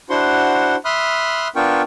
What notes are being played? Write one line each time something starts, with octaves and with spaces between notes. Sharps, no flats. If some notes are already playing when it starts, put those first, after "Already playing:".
D4 E4 F#4 C5 F#5 C6
E5 B5 C6 D#6 F6 F#6
B3 D4 F4 A#4 G5 C#6